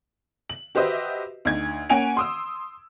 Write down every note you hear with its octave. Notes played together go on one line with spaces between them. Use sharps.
F#7
F#4 G4 B4 C5 D#5 E5
D2 D#4 G#6
A#3 C#4 F#5 G#5 D7 F7
C6 D#6 E6